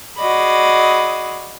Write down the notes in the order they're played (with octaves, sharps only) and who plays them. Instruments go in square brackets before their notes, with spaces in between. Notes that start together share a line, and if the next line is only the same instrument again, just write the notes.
[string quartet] F#4 G#4 D5 D#5 B5